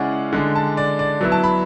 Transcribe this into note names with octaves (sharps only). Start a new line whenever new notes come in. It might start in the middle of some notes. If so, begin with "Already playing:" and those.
Already playing: C#3 G#3 C#4 E4 D5 F#5
D3 G#3 D4
A5
D5
D5
F#3 B3 E4
A5
B5